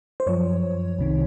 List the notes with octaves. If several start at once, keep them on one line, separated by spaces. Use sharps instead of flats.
C5
F#2 F3 C#5
C2 C3 D#3